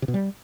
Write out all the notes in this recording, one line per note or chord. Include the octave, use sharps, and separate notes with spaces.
C3
B2
G3